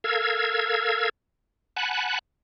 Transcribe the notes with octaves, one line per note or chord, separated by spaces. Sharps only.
A4 A#4 F5 E6 G#6
F#5 G#5 A5 B5 F#6